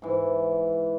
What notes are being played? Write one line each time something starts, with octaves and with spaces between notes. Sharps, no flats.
G#2 E3